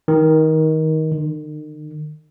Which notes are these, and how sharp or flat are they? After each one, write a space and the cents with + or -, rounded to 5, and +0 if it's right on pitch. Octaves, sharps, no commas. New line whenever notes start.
D#3 +20
D#3 -40